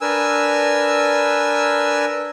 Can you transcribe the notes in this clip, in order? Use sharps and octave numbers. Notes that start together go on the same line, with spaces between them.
D4 A#4 B4 G#5 E6